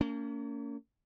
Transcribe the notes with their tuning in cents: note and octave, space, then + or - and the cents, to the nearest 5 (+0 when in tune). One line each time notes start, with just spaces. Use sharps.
A#3 -30 C#4 +35